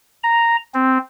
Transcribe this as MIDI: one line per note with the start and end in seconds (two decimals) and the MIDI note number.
0.23 0.56 82
0.74 0.98 60